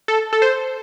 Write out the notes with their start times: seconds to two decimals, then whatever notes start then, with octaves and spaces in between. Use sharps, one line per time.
0.08 A4
0.33 A4
0.42 C5